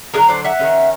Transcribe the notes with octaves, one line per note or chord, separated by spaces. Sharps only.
D3 F#3 B3 D4 G#4 A#4
C5 D5
E5 F#5
D#3 G#3 C#4